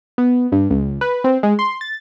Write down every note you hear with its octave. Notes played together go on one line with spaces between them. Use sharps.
B3
G2
C#2
B4
C4
G#3
C6
A6